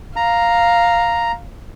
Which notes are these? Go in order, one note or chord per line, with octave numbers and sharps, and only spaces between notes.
F5 A#5